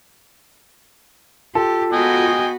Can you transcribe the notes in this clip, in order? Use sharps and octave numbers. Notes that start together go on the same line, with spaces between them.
F4 G4 A4
B3 F#4 D#5 G5 G#5